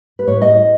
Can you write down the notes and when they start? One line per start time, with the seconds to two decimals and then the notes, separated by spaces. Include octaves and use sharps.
0.19 B4
0.27 A2 C#5
0.41 A2 D#5